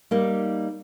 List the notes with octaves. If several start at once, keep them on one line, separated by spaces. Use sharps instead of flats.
G3 A#3 D#4